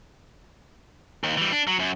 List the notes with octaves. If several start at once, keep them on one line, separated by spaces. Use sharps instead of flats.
D#2
E3 G3
D4
F#3
F#2